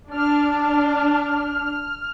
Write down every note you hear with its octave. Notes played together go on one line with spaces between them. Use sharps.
D4 F6